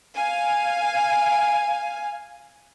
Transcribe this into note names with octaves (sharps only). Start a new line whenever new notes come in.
F5 G#5